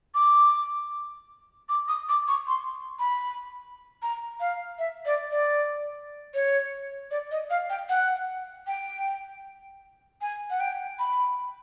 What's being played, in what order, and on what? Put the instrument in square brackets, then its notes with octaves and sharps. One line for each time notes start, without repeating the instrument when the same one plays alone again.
[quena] D6
D6
D#6
D6
C#6
C6
B5
A#5
F5
E5
D5
D5
C#5
D5
D#5
F5
G5
F#5
G5
G#5
F#5
G5
B5